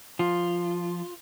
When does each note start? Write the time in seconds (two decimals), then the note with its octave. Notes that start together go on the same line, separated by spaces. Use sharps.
0.19 F3 F4